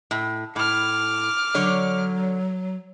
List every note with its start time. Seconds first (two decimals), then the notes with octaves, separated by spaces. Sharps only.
0.11 A2
0.56 A2 D6 F6
1.54 D3 F#3 C#5